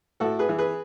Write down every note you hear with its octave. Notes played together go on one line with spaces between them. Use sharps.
A2 F#4 A4
G#4 B4
E3
G#4 B4